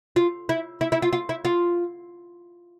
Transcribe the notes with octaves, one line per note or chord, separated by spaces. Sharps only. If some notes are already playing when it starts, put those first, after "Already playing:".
F4
E4
E4
E4
F4
F4
E4
F4